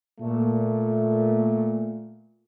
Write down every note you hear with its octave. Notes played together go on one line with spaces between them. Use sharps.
A#2 A3